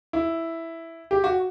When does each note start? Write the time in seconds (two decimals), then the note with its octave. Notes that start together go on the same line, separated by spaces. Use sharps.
0.13 E4
1.11 G4
1.24 F#4